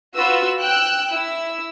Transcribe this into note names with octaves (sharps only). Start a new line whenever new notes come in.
F4 F#4 B4 E6
G5 E6 F#6
E4 E6